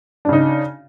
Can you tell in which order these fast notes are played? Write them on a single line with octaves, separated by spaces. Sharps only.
D4 C#3 D#4